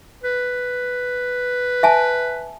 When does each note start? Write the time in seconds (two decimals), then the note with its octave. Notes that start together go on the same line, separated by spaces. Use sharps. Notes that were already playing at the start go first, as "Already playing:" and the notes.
0.24 B4
1.83 E5 G#5 A5